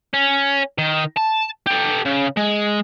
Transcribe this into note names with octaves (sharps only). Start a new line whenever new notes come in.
C#4
D#3
A5
G4 A4
C#3
G#3